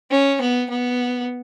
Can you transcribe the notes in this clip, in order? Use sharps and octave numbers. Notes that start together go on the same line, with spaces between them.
C#4
B3
B3